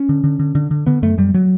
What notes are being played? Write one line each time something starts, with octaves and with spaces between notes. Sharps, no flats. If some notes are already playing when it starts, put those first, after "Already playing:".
Already playing: C#4
D3
D3
D3
D3
D3
D3 B3
F#2 A3
F#2 G3
F#3